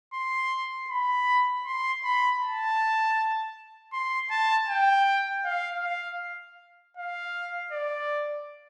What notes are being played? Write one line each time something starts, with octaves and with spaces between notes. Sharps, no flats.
C6
B5
C6
B5
A5
C6
A5
G5
F5
F5
F5
D5